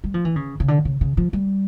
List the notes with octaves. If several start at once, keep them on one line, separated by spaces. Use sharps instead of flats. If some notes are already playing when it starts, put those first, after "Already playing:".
G3
F3
E3
C#3
C#3
D3
C#3
C#3
F3
G3